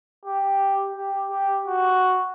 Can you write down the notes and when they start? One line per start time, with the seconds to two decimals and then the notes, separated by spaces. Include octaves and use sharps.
0.25 G4
0.95 G4
1.31 G4
1.67 F#4